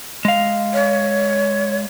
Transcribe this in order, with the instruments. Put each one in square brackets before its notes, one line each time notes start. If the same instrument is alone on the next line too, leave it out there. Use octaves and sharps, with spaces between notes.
[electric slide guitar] G#3 F5
[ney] C#5